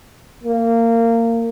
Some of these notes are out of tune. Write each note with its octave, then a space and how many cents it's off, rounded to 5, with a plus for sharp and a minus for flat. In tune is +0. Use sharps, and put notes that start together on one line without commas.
A#3 -20